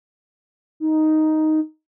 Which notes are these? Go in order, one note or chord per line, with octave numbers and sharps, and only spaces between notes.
D#4